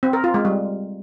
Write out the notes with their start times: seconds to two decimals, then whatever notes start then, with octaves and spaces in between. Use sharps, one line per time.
0.03 C4
0.13 A#4
0.24 F4
0.34 G#3
0.45 G3